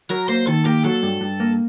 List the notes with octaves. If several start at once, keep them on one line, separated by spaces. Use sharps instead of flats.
F#3 A#4
A#3 C5
D#3 A4
A#3 G4
F#3 A4
G2
G2
A#3